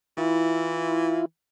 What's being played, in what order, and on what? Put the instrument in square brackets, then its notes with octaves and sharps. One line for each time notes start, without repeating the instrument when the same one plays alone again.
[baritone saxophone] E3 [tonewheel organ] E4 F4